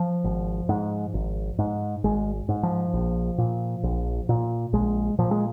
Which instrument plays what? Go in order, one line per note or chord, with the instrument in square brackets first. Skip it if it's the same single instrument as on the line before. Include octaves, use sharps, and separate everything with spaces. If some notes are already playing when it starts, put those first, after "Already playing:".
Already playing: [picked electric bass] F3
G#1
G#2
G#1
G#2
G#1 G#3
G#2
F3
A#1
A#2
A#1
A#2
A#1 G#3
A#2 F3
G#3